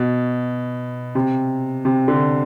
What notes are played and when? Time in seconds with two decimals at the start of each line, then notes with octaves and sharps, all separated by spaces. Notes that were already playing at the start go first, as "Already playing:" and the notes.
Already playing: B2
1.15 C3
1.85 C3
2.08 D3